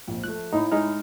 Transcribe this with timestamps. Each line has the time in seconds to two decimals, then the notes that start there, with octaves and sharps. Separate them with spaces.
0.07 A#1 F2
0.24 F3 A3 F#6
0.53 A2 D#4 E4
0.72 G#3 D#4 F6